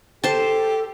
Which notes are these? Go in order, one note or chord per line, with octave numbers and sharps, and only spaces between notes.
G4 A4 C5 A5